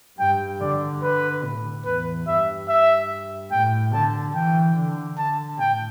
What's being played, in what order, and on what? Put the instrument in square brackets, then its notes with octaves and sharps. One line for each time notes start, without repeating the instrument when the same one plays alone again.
[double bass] G2 [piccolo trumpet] G5
[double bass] D3 [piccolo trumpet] D5
[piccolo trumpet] B4
[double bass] A2
[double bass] E2 [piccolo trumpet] B4
[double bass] G2 [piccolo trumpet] E5
[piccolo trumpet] E5
[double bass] A2 [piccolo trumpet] G5
[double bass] D3 [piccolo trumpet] A5
[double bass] E3 [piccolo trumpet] G5
[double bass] D3
[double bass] D3 [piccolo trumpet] A5
[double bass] A2 [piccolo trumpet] G5